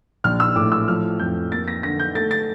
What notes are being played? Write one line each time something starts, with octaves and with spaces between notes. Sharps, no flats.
A#1 F6
E6
A2 D6
E6
F3 F6
F2 G6
A#3 A6
A#6
D3 A#6
G6
A3 A6
A6